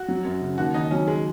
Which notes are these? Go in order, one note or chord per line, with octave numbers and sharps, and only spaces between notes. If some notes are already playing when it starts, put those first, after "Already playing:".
Already playing: F#4
F#3
F#2
C#3
D#2 F#4
D#3 D#4
F#3 C#4
G#3